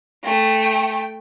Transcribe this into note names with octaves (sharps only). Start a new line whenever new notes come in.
A3 G5